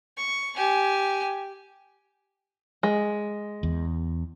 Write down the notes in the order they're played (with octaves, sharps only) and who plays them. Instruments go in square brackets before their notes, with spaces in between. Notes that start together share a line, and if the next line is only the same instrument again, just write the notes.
[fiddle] C#6
G4 G#5
[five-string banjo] G#3
[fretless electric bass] E2